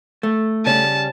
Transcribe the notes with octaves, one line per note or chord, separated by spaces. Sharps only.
A3
C#3 G3 C#4 A5